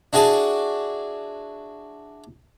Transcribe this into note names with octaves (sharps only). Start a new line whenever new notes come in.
D4 E4 F#4 G#4 A5